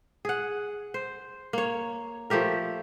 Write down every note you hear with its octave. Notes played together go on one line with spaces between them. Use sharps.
G#4 F#5
C5
A#3 C#5
F3 A3 G4 A#4